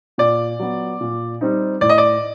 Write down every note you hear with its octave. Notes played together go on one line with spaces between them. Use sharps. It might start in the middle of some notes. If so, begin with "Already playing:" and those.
A#2 D5
F#3 B3
A#2
G3 C4 D#4
A2 D5
D#5
D5